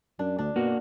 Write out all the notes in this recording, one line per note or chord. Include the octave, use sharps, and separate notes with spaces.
F#2 D4
D2 D4
B2 A#3 F#4